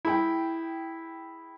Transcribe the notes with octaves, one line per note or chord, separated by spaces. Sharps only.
E4 G#4 G5